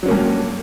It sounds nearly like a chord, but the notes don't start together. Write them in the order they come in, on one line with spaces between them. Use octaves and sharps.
F#3 C#4 A#3 G2